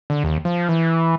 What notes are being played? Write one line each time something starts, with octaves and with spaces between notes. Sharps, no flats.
D3
D#2
F3
E3